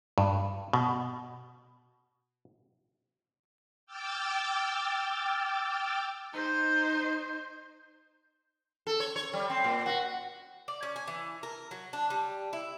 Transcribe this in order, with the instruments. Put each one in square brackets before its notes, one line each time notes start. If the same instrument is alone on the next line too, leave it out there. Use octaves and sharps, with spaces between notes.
[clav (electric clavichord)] G2
B2
[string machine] G5 D6 E6 F6 G6 A6
[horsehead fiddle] D#4 C5
[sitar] A4
C#5
C#5
G3
C4
A#2
F#4
[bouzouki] D5
C#4
G#5
E3
A#4
F#3
D4
G3
E4